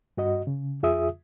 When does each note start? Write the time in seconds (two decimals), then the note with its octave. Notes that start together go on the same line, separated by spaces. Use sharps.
0.17 G2 F#4 D#5
0.47 C#3
0.83 F2 F4 G#4 E5 D#6